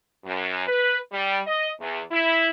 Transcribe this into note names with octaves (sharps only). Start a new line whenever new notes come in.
F#2
B4
G3
D#5
E2
E4